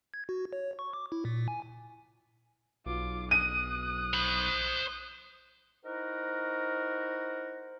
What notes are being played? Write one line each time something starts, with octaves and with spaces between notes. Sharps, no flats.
G#6
F#4
C#5
C#6
D6
E4
A#2
G#5
B1 F4 D6
D#6 F#6 D#7
C5 B5
D#4 E4 F#4 A#4 C5